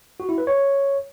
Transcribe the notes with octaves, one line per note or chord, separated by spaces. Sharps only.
F#4
E4
B4
C#5